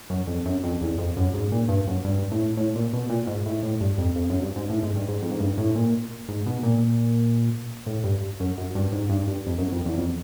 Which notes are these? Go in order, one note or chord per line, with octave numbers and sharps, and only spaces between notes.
F#2
F2
F#2
F2
E2
F2
F#2
G#2
A#2
G2
F#2
G2
A2
A2
A#2
B2
A#2
G#2
A2
A2
G2
F2
F2
F#2
G2
G#2
A2
G#2
G2
G#2
F2
G#2
G2
A2
A#2
G#2
B2
A#2
A2
G2
F#2
F#2
G2
G#2
G2
G2
F2
F#2
F2
E2
F2